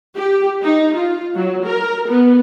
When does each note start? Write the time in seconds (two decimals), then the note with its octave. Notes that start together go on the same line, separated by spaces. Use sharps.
0.16 G4
0.63 D#4
0.96 F4
1.35 F#3
1.66 A#4
2.09 B3